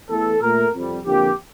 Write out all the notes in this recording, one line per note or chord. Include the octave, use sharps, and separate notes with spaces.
E2 E3 A3 A4
A#2 A3 A#4
F2 C3 G3
F2 D3 F3 A#3 G4